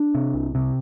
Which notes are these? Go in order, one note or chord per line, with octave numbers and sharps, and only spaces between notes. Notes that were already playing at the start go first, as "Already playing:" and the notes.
Already playing: D4
C3
C2
C3